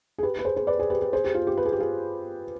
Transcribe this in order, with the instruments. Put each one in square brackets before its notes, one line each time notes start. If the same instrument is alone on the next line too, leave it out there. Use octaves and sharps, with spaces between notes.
[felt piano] G#4
G4 B4
B4
G#4 C5
G#4 C5
B4 D5
G#4 C5
G4 B4
G4 B4
G#4 C5
G4
F4
G4
B4
G#4
G4
F4 G#4